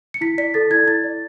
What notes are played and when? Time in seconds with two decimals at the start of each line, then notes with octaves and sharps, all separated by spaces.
0.14 C#7
0.21 E4 B6
0.38 D5 B6
0.54 A4 A6
0.70 E4 G#6
0.87 E4 A6
1.04 D5